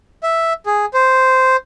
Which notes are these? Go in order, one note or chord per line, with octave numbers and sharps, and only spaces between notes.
E5
G#4
C5